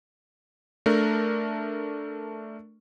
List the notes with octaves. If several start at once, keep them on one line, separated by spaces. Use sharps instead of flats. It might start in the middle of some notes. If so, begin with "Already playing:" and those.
A3 D4 A#4